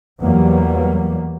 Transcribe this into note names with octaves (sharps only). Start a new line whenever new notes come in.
E2 F#3 G3 A#3 B3